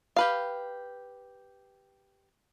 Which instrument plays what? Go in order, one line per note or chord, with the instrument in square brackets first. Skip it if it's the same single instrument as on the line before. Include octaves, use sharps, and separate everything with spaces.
[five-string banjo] G4 B4 F5